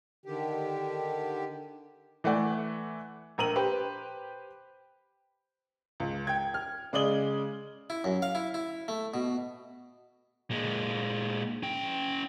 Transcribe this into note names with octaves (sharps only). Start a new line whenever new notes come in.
D3 D#3 G4
E3 A3 D5 F#5
A#1 A#4 D#7 F#7
G4 B4 C5
C#2
G5 G#6
F6
C#3 G#3 D5 D#6 F#7 G7
E4
F#2
F5
E4
E4
A3
B2
A#2 G#3
C#4 G5